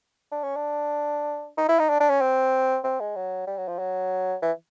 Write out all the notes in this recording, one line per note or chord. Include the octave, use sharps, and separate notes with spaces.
D4
C#4
D4
D#4
E4
D#4
D4
D4
C#4
C4
C4
G#3
F#3
G3
F#3
F3
F#3
E3